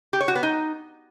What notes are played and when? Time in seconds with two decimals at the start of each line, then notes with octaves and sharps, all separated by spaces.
0.13 G4
0.21 C#5
0.28 F#4
0.35 B3
0.43 D#4